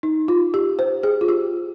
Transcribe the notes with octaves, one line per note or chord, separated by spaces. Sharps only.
D#4
F4
G4
C5
G#4
F4
G4